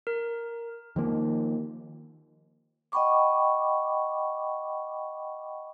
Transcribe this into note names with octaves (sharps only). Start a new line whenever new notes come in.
A#4
D#3 F3 A#3
D#5 F#5 G5 B5 C#6 D6